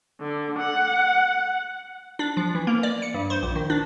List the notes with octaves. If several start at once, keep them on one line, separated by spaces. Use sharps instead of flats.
D3
F#5
D4
F3
E3
A#3
D5
C#7
G2
C5
A#1
D#3
D4